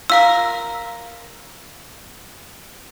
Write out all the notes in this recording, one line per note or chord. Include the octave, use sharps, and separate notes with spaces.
F4 A#4 F5 E6